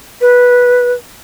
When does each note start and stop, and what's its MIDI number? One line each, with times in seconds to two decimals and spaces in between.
0.21 0.93 71